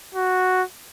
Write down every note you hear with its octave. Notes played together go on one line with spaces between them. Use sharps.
F#4